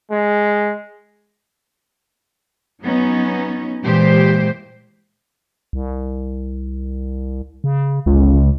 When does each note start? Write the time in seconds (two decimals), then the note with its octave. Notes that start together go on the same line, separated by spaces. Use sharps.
0.11 G#3
2.82 F#3 B3 C#4 D#4
3.84 A#2 E3 G#3 G4 C5
5.73 C2
7.64 C#3
8.06 G1 C#2